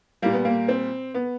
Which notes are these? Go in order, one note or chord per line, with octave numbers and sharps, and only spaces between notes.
A#2 G3 A#3
B3
A#3
C4
B3